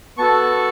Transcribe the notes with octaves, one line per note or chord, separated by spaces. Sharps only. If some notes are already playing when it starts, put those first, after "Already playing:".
B3 F#4 A4 A5 C#6